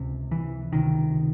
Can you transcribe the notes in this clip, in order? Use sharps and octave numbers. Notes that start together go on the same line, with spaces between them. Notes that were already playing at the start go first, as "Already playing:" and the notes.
Already playing: C#2 C3
E3
C#2 C3 D#3